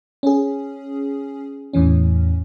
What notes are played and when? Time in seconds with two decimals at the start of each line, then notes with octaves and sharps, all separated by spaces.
0.23 C#4 G#4
1.73 E2 A2 E3 C#4